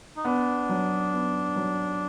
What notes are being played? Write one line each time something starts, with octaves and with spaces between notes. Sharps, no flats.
D#4
B3 D4
F#3
B3
F#3